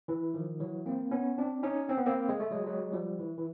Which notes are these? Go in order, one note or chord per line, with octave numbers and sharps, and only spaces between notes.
E3
D#3 F3
E3 F#3
A#3 C4
B3 C#4
C4 D4
C#4 D#4
C4
B3
A#3 C4
G#3
A3
F#3 G#3
F#3 G#3
F3 G3
E3
E3